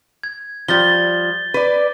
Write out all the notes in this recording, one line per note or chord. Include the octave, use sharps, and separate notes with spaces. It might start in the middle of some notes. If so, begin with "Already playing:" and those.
G#6
F3 G3 G6 A6 G7
B4 D5